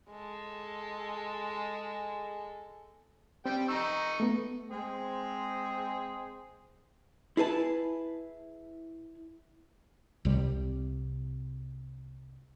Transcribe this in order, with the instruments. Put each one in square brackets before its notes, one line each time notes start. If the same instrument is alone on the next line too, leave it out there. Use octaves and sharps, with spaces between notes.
[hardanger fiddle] G#3 A4
[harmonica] G3 G5 [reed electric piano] C4
[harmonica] D#4 C#6 [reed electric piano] A#5 E6
[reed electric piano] A3 B3
[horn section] G#3 C4 G#4 C5
[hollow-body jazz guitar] E4 G#4 B4 A5
[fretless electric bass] C2 C3 G3